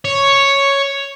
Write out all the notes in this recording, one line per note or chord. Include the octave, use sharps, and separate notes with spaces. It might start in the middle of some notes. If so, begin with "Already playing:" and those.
C#5